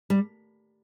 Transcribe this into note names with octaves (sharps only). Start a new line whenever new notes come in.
G3